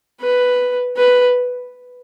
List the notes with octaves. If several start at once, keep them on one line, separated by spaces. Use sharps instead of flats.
B4
B4